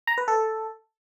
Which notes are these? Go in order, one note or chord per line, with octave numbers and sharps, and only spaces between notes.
A#5
B4
A4